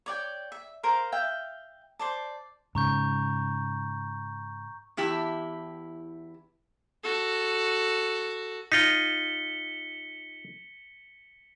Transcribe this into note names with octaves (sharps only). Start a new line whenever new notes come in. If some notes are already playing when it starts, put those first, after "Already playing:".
C#5 D5 G5
E5
A#4 C5 F5
E5 F5 G5
C5 D5 A5
G#2 C#3 A#5 C#6 G6
E2 E4 G4 A5
F#4 A4
D#4 F4 B6 C#7 G7